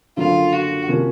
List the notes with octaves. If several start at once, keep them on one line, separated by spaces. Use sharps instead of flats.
F#1 F#2 D3 F3 F4
F#4
C3 F3 A#3 C#4